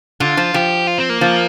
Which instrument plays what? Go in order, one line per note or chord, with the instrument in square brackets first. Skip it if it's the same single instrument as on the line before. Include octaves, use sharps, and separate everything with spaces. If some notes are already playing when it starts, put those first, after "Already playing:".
[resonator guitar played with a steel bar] D3 [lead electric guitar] F4
[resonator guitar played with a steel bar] F3
[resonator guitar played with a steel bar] F3 [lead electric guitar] G4
[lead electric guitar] F4
C4
A#3
[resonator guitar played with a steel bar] F3